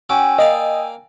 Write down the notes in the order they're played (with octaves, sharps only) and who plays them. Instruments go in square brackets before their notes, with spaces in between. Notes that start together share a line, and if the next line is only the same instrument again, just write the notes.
[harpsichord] C#4 F#4 D6 [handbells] G5 G#5 E6
[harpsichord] A#3 D5 F5 [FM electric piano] D#5